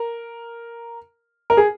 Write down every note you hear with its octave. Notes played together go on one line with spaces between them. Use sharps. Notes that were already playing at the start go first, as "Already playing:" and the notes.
Already playing: A#4
A#4
G#4